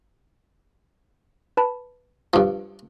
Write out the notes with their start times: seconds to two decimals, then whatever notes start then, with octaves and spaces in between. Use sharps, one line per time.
1.57 B4 A5 B5
2.34 G2 F3